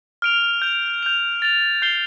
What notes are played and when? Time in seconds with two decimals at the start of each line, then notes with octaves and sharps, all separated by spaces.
0.22 F6 D7 F7
0.62 G6 F7
1.03 G6 F7
1.42 A6 F7
1.82 G6 C7 G7